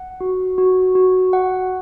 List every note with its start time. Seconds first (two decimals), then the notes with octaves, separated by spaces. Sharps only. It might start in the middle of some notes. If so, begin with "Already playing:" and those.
Already playing: F#5
0.21 F#4
0.58 F#4
0.95 F#4
1.33 F#5